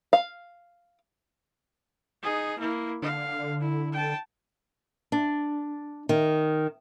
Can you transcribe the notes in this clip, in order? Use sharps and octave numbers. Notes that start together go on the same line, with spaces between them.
F5
D#4 G#4
A#3 E4
D3 F5
E4
G5 A5
D4
D#3